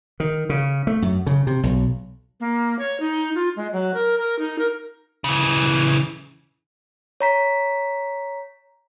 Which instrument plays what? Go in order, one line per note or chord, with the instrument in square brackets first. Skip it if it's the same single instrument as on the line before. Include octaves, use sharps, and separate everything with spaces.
[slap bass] D#3
C#3
A3
F#2
C#3
C3
B1
[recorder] A#3
C#5
D#4
F4
G#3
F#3
A#4
A#4
D#4
A#4
[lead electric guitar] C#3 E3
[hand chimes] C#5 A#5 B6